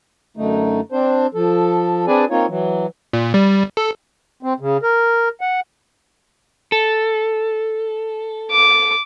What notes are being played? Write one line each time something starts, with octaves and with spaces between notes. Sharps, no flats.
F#2 D3 A3 D#4
C4 D4 C5
F3 A4
C4 D4 G#4 B4 D5 G#5
A#3 C4 D#4 F4 C#5
E3 F#3
A#2
G3
A4
C4
C#3
A#4
F#5
A4
D6